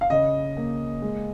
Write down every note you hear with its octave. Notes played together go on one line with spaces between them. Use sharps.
F5
C#3 D#5
A#3
G#3